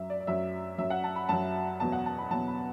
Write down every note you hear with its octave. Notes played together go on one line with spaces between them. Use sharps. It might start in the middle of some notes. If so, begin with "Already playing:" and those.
Already playing: F#2 F#3 E5
D5
D5
F#2 F#3 E5
F#2 F#3 E5
F#5
A5
B5
F#2 F#3 A5
E2 B2 F#3 A5
F#5
A5
B5
E2 B2 F#3 A5
B5